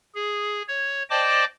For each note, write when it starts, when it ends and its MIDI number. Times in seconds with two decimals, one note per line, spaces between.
0.15 0.62 68
0.68 1.03 73
1.10 1.45 72
1.10 1.45 74
1.10 1.45 75
1.10 1.45 79
1.10 1.45 81
1.10 1.45 86